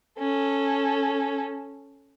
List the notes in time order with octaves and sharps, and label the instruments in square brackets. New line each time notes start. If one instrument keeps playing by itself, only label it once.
[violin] C#4 A4